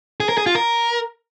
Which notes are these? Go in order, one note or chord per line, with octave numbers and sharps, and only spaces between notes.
G#4
A#4
G#4
F4
A#4